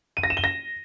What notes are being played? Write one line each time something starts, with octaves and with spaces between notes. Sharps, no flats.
D#7
A#6
E7
G7
A#6